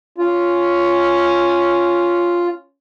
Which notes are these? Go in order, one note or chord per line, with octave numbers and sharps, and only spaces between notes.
C#4 F4